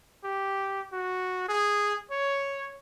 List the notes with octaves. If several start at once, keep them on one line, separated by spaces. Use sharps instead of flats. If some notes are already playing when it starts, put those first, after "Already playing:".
G4
F#4
G#4
C#5